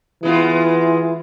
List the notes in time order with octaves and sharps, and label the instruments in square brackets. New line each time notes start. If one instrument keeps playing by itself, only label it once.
[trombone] E3 [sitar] G#3 B3 F4